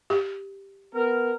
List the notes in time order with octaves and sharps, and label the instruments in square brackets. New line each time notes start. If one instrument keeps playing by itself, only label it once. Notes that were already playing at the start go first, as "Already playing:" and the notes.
[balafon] G4
[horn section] B3 A#4